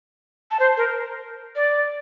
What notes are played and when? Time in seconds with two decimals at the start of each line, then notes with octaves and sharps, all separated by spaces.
0.51 A5
0.60 C5
0.77 A#4
1.56 D5